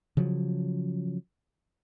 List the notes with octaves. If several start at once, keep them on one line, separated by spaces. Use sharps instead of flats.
C#3 F3 F#3